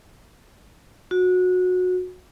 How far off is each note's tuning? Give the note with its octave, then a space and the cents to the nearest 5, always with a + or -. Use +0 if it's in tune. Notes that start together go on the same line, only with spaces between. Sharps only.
F#4 -20